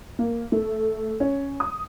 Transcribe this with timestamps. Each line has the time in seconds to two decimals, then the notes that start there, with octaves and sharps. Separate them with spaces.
0.19 A#3
0.52 A3
1.20 C#4
1.60 D#6